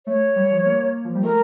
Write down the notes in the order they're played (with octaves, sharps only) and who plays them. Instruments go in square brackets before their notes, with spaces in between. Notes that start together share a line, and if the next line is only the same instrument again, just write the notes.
[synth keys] A3 [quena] C#5
[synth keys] G3
F3
A#3
F3
G3
[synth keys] A3 [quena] A#4